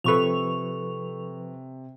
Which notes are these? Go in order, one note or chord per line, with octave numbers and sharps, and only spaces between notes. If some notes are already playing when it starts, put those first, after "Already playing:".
C3 F3 A4 B4 C#6 F7